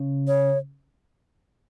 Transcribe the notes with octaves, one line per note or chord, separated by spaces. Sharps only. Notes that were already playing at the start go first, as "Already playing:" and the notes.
Already playing: C#3
C#5